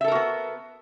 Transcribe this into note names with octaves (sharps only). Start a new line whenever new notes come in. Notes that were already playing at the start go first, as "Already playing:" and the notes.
B3 F#4 A4 A#4 E5